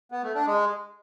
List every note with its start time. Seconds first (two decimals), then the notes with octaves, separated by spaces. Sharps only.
0.12 B3
0.23 A3
0.35 D4
0.47 G#3